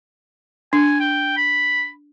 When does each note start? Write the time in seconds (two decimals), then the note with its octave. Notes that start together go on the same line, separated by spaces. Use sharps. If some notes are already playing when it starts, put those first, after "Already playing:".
0.73 D4 G#5
1.00 G5
1.37 B5